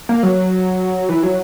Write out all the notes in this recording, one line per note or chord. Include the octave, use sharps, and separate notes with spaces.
A#3
F#3
E3
F#3